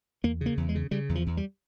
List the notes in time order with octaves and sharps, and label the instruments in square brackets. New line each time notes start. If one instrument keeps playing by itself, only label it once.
[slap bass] E2 A#3
C#3 A#3
E2
G#3
C#3
C#3 G3
E2
F3
E2
G3